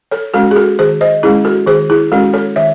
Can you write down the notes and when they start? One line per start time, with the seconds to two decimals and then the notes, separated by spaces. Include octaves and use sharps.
0.11 A4 C#5
0.34 G#3 C#4 F#4 A4
0.51 G#4
0.56 F#4 A4
0.79 D#3 G#4 C5
1.01 C5 D#5
1.23 G#3 C#4 E4 G#4
1.45 F#4 A4
1.67 D#3 G#4 C5
1.90 E4 G#4
2.12 G#3 C#4 F#4 A4
2.33 A4 C#5
2.56 D#3 C#5 E5